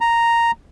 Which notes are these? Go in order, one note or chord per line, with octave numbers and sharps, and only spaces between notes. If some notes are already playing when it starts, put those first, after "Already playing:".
A#5